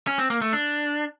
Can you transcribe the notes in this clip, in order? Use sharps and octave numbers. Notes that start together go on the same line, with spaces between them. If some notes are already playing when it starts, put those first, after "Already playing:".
C#4
C4
A#3
A3
D4